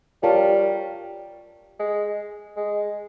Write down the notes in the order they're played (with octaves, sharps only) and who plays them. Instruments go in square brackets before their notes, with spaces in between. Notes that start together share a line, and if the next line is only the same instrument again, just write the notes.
[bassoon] G3 [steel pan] F4 A#4 C#5 F5 A5
[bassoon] G#3
G#3